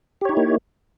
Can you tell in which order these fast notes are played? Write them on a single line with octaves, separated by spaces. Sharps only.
G4 C#5 D#4 E4 A#3